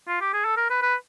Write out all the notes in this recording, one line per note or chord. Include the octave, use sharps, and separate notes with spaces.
F4
G4
G#4
A4
A#4
B4
B4